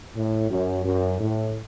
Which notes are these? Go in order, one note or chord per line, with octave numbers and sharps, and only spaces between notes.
A2
F#2
F#2
A2